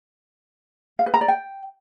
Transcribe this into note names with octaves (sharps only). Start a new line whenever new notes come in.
F5
B4
A#5
D5
G5